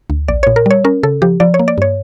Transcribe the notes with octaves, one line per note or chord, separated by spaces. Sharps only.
D2
A#1 D5
A#2 C#5
A#4
G3 C#5
C#4 A#4
C#3 A4
F3 G4
F3 D5
C#5
A#3
D5
G2 C#5